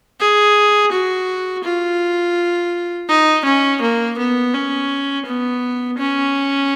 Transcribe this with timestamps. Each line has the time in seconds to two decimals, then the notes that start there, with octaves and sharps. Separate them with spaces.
0.20 G#4
0.91 F#4
1.64 F4
3.08 D#4
3.45 C#4
3.81 A#3
4.18 B3
4.54 C#4
5.26 B3
5.98 C#4